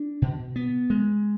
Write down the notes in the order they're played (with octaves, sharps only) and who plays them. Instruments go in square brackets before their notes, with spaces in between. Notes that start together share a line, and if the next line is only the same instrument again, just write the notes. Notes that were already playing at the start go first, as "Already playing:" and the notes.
Already playing: [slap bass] D4
B2
B3
G#3